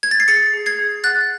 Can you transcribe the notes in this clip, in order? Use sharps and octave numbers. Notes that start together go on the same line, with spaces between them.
G#6
A6
C7
G#4 A6 C#7
G#4
G#6 C7
G#4
F#5 F#6 A6